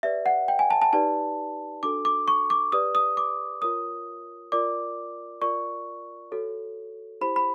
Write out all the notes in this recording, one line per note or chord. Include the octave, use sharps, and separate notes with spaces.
G4 B4 D5 E5
F#5
G5
G#5
A5
A5
D#4 G4 B4 D5 A5
D4 F#4 A4 D6
D6
C#6
D6
G4 B4 D5 D#6
D#6
D6
F4 A#4 C#5 D#6
F4 A#4 D5 D6
F4 A#4 D5 C#6
F#4 A4 C#5
E4 G4 C5 B5
B5